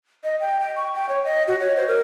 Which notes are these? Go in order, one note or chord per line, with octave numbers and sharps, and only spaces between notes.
D#5
G5
G5
C#6
G5
C#5
D#5
F#4
C#5
C5
A#4